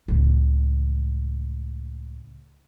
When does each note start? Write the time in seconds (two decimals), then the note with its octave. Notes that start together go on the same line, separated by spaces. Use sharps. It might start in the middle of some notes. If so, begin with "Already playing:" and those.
0.08 C#2 A2